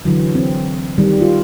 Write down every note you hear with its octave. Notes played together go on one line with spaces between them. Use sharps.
D3 E3 F#3
C4
D#3 G3
F4